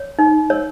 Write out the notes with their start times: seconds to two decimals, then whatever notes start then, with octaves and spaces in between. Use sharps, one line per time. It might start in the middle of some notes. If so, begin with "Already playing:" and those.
Already playing: C#5
0.19 D#4
0.50 C#5